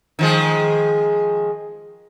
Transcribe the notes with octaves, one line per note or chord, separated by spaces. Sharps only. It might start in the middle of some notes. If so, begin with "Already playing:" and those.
D#3 F3 G#3